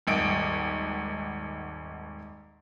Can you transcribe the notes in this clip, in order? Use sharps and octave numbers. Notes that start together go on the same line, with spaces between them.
D#1 G#1 D7